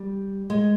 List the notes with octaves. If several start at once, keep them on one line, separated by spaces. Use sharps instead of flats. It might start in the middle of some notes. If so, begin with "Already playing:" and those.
Already playing: G3
G#3